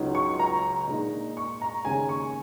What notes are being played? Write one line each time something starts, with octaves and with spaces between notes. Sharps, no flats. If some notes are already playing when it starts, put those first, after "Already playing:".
Already playing: C#2 C#3 F#3 D#4
C#6
A#5
A#2 G#3 D#4
C#6
A#5
D#2 C#3 G#3 C#4 G#5
C#6